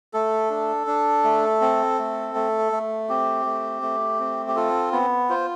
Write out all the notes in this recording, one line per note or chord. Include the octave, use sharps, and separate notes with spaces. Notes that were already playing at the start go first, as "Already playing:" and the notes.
A3 A4
D4
D4
A3
C4
A3
A3
A3
C4 G4
A3
A3
C4
G4
F4 A4
B3
F4 C5